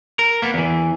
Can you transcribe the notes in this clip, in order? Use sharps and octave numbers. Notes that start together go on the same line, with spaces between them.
A#4
A#3 B3
E2 E3